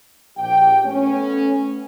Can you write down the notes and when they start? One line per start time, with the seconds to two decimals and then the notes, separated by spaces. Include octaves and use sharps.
0.38 A#1 G4 G5
0.85 A3 B3 C#4